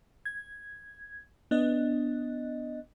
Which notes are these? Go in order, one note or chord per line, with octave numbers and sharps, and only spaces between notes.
G#6
B3 D4 D#5